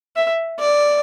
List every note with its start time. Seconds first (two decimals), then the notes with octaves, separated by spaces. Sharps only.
0.17 E5
0.59 D5